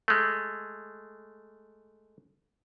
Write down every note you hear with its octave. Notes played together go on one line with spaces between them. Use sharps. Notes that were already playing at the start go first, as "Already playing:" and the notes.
G#3 A3